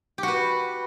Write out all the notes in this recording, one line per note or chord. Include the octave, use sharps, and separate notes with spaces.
F#4 G4 B4